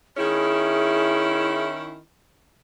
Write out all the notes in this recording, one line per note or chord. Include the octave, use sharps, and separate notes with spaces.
D#3 C#4 E4 G#4